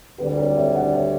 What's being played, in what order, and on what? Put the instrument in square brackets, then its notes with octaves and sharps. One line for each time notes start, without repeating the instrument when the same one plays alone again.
[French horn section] D2 D3 G3 [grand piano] G4 B4
[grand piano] A#4 C#5
C#5 E5
D5 F#5
C#5 E5